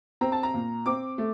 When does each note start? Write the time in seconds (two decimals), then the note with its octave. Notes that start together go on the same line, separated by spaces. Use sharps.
0.21 C4 A#5
0.32 A5
0.43 A#5
0.54 A#2
0.86 C4 D6
1.18 A3